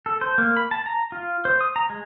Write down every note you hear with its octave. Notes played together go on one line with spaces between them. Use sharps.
A4
C5
A#3
B5
A5
A#5
F4
C5
D#6
A#5
G#3